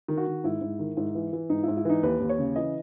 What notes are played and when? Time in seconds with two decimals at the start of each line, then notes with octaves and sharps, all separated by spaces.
0.08 D#3
0.17 F#4
0.27 D#3
0.44 G#2 E4
0.61 G#2
0.79 D#3
0.97 G#2 E4
1.15 E3
1.33 E3
1.50 G#2 D#4
1.63 G#2 E4
1.77 E4
1.85 E3 D#4
2.03 D#2 B4
2.20 D#2
2.29 C#5
2.38 C#3
2.56 E3 D#5